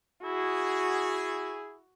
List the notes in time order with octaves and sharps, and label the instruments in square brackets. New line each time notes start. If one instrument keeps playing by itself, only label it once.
[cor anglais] E4 [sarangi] F#4 [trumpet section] G#4